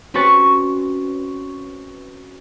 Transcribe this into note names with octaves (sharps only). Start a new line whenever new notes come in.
C4 C#4 F#4 B4 C#6 A6